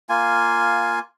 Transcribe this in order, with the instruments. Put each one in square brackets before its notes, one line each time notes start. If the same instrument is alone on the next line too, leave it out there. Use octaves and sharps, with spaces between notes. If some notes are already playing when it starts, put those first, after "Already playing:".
[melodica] A#3 F4 G#5